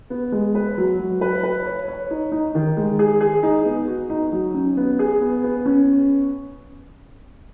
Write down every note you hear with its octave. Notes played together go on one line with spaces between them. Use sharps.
B3
G#3
B4
F#3
F#3
B4
B4
C#5
C#5
D#4
D#4
D#3
G#3
G#4
G#4
D#4
B3
F#4
D#4
F#3
C#4
B3
G#4
B3
B3
C#4